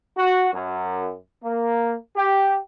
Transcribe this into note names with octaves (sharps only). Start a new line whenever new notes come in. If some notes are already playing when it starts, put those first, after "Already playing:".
F#4
F#2
A#3
G4